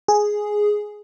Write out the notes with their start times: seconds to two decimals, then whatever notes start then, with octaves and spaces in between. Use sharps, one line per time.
0.08 G#4